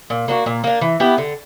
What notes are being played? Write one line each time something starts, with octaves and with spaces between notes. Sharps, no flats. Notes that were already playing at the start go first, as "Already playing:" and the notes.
A#2
A#3 D4 F#4
A#2
A#3 D4
E3
B3 E4 G4
D3